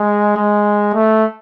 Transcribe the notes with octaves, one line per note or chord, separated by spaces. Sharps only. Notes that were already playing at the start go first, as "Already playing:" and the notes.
Already playing: G#3
G#3
A3